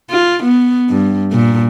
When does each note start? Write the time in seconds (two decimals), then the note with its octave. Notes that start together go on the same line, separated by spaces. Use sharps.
0.10 F4
0.44 B3
0.89 G2
1.32 A#2